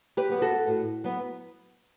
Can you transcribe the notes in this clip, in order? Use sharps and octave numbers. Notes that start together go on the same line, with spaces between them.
G4 B4
F#3 B3
F#4 A4
A2
F#3 B3